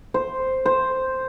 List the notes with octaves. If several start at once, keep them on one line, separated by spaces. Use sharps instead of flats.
C5
C5